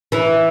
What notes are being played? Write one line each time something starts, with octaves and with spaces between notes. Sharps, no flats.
E3 E4